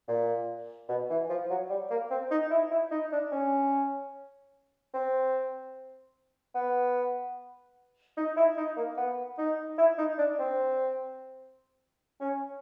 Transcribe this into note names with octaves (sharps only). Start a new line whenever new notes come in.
A#2
B2
E3
F3
F#3
G3
A#3
C4
D#4
E4
E4
D#4
D4
C#4
C4
B3
D#4
E4
D#4
A#3
B3
D#4
E4
D#4
D4
C4
C#4